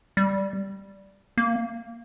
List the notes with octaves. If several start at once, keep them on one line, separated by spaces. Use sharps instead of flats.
G3
A#3